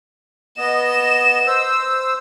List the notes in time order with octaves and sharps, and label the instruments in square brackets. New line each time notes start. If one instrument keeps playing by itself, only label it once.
[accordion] B3 D#5 [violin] E7
[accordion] C5 E6